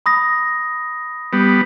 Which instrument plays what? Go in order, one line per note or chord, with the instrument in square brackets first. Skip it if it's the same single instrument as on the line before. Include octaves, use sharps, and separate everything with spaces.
[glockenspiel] B5 D#6 A#6
[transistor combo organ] G3 B3